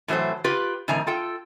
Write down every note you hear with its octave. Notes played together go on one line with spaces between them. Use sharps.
A2 E3 F#3 A4 C5
F4 G4 B4
F2 A2 D#3 G#5 A#5
F4 A4 G5